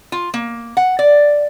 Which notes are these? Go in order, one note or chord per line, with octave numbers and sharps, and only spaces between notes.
F4
A#3
F#5
D5